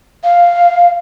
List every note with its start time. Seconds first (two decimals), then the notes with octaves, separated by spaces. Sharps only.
0.24 F5